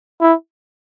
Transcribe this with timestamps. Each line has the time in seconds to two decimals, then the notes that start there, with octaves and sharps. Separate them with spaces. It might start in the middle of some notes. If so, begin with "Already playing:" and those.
0.21 E4